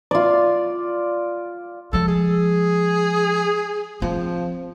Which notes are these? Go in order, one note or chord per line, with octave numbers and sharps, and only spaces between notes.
F4 D5
F3 G#3 A4
G#4
F3 C4